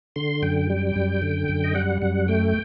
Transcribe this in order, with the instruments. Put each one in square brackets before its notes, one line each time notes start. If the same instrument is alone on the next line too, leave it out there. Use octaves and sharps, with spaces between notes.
[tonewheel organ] D3 C6
F#2 G5
G3
F#2
D3
F#2
D#5
G3 F#5
F#2 F#5
A3 G5